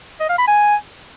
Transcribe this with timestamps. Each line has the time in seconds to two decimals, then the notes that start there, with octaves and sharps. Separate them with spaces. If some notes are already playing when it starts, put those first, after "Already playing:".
0.20 D#5
0.29 F5
0.38 B5
0.48 G#5